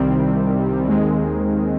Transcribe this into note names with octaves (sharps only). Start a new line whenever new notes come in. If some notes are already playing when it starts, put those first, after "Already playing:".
Already playing: C2 C3 D#3 G3 C4
D#2 D#3 G#3 C4